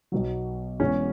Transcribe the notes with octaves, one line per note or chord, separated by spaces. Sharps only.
B1 B2 F#3
E1 E2 E3 C#4